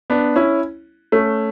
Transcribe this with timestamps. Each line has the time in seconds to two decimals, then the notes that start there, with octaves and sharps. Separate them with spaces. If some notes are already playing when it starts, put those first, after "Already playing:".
0.10 B3 D4
0.36 C#4 E4
1.12 A3 C#4